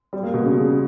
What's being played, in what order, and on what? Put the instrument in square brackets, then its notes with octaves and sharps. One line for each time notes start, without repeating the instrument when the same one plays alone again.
[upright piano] G3
A#3
B2
C#3